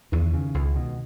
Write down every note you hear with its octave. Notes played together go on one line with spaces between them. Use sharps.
E2 D#3
C#3
C#2
B2